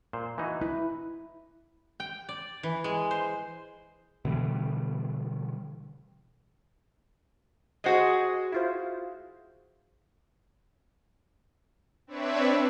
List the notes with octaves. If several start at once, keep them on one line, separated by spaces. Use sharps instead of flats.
A#2 C5
E3 D#4 F#4
E4 B4
G5
D5
E3
G#3
C5
B2 D3 E3 G3
G#3 F#4 G#4 C5 D#5
E4 F4 C5
C4 D4 B4 C#5 D5 E5